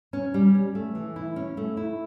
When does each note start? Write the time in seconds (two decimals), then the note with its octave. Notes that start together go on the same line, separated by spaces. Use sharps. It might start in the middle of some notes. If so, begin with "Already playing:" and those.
0.13 C#4
0.34 G3
0.54 C#4
0.75 A3
0.95 E3
1.16 E4
1.36 C#4
1.57 A3
1.77 E4